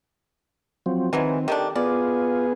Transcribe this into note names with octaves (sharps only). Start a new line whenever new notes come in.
F3 F#3 C4
D#3 E3 F#3 G#3 C4
D#3 A3 D4 G4
B3 F4 G#4 D5